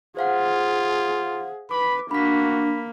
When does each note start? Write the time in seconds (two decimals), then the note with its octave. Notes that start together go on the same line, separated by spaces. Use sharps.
0.17 F4 G#4 C5 F5 F#5
1.71 B4 B5 D6
2.11 A#3 D4 F#4 B5 B6